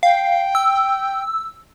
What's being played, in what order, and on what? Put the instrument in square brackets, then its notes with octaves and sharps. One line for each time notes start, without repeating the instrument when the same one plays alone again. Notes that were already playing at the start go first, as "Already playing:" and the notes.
[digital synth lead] F5 [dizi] G5
[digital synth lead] E6